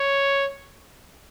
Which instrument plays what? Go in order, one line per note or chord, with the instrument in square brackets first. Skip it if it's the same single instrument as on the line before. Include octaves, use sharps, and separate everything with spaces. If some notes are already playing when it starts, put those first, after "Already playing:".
Already playing: [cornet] C#5